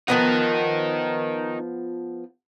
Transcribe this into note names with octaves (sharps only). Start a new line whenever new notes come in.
F3 B3 D#4 A#4 F#5